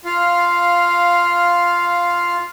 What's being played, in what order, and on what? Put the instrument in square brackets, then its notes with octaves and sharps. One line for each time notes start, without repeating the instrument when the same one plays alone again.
[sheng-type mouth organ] F4 F5